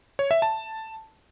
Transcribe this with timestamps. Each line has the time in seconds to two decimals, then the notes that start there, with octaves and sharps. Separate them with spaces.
0.19 C#5
0.31 E5
0.42 A5